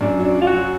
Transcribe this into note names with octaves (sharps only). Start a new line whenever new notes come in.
F#2 D4
F#3
D4
F#3
F4
F#4
F#3